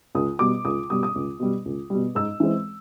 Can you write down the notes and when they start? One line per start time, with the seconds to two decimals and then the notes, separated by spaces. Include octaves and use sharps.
0.15 C#2 D#6
0.39 B2 G3 D6
0.65 C#2 D#6
0.90 B2 G3 D#6
1.03 D#6
1.15 C#2
1.40 B2 G3
1.65 C#2
1.90 B2 G3
2.15 G#2 E6
2.40 E3 G#3 C4